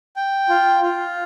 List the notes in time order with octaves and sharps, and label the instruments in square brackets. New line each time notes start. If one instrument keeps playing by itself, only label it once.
[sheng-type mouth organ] G5
F4
F4